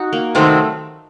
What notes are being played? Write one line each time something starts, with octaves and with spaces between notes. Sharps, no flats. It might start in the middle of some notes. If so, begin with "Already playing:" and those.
Already playing: D#4 F#4
A#3
C3 D#3 F#3 A3 C4